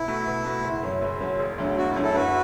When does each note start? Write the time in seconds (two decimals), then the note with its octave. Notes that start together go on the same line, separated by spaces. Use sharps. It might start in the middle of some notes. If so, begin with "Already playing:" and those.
Already playing: B2 E4
0.08 A3 F#4
0.27 B2
0.45 A3 F#4
0.64 F#1
0.83 F#2 F#3
1.02 F#1
1.21 F#2 F#3
1.39 E1
1.58 D2 D3 F#3
1.77 E1 F#4
1.90 E4
1.96 D2 D3 F#3
2.02 E4 A4
2.15 F#2 F#4 B4